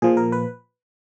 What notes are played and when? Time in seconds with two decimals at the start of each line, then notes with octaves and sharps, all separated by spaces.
0.02 A#2 F3 G#4
0.17 A#4
0.32 B4